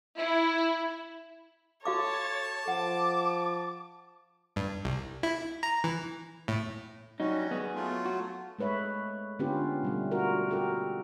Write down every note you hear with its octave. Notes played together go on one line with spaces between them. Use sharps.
E4
F#4 A4 C#5 F5 A5 D6
F3 F#5 D6
G2
C2
E4
A#5
E3
A2
F#3 G3 C#4 D#4 F#4
B3 G#4
F#3 A3 F4
F#4
G#3 A3 B4 C#5 E5
D3 B3 C#4 F4 G4 B4
B2 G3 A3
F4 F#4 A#4
F#4 G4 A4 A#4